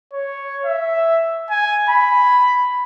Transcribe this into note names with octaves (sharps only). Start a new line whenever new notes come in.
C#5
E5
G#5
B5